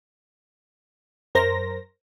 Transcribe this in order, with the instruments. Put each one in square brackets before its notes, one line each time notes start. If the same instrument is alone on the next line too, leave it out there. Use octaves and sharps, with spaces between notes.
[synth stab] F#2 A#4 C5 A#6